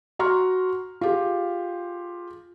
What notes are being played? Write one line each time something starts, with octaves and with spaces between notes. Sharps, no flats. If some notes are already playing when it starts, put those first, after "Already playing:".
F#4 A#5 C6 C#6 F6
F4 G4 G#4